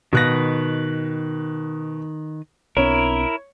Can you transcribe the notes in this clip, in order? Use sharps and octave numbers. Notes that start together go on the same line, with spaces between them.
B2 D#3 B4 F#6 A#6
B1 C4 D4 E4 A#4 C#5